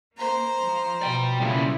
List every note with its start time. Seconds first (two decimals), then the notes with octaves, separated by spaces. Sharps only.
0.17 A#3 C5 A#5
0.61 F3
1.02 B2 D5 G5
1.40 C#3 G3 A#3 E4 F4